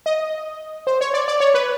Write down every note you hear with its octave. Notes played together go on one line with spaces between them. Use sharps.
D#5
C5
C#5
D5
D5
C#5
B4